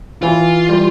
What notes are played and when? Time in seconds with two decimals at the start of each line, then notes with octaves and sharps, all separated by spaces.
0.22 E3 F4
0.69 G3